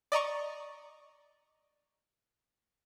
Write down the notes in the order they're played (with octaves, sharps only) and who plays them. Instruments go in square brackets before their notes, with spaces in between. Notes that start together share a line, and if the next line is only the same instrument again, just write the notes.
[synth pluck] D5 D#5 A#5 C#6